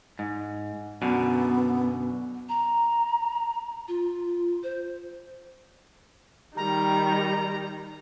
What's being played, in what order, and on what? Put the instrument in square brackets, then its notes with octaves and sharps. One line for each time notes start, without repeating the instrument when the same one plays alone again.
[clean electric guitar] G#2
[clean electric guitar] F#2 B2 D3 [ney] B3
[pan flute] A#5
F4
C5
[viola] D#3 G3 [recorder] A#5